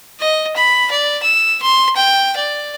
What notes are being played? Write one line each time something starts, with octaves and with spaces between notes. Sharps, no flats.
D#5
B5
D5
E6
C6
G5
D5